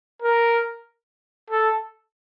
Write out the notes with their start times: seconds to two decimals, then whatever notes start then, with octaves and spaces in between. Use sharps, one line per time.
0.22 A#4
1.50 A4